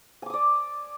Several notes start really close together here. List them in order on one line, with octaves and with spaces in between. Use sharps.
G#5 D6 D#6 D5